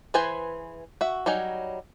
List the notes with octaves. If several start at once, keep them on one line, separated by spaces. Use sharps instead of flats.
E3 G#4 B4 C5 G#5
F#4 E5
F#3 G3 D#4 G#5